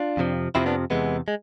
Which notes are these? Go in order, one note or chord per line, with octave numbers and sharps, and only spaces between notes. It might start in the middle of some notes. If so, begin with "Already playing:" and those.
Already playing: D4 F4
F2 C3 F3
F2 C3 F3 C4 E4
B3 D4
E2 C3 E3 G#3 B3
G#3